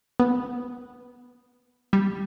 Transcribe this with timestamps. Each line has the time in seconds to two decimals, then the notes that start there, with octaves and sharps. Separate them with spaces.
0.20 B3
1.93 G3